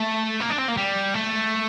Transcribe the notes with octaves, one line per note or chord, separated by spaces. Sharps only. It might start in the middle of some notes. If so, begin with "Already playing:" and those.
Already playing: A3
A#3
D4
C4
A#3
G3
A3